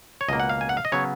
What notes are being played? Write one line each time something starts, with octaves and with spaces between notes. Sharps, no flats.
C#5
C#2 B2 A#3 D#5
F#5
F5
G#5
F#5
F5
D#5
C#3 F#3 B3 C#5